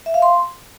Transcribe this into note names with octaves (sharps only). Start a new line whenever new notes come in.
E5
F5
C6